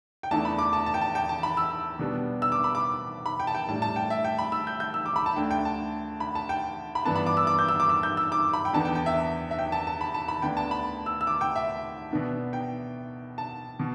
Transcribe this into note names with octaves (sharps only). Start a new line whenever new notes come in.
G5
E2 E3 A3 D4 A5
B5
D6
A5
A5
G5
A5
G5
A5
B5
E6
B2 G3 B3 D4
E6
D6
B5
D6
B5
G5
A5
G5
A2 G3 D4 A5
A5
G5
E5
G5
B5
E6
G6
G6
E6
D6
B5
A5
D2 D3 A3 D4 G5
G5
A5
B5
A5
G5
B5
G2 E3 B3 D4 A5
B5
D6
E6
D6
G6
E6
D6
E6
G6
E6
D6
B5
G5
E2 D3 B3 A5
G5
G5
E5
E5
G5
A5
A5
B5
A5
B5
D2 D3 B3 D4 G5
A5
B5
E6
E6
D6
G5
E5
B2 B3 D4
G5
A5
B2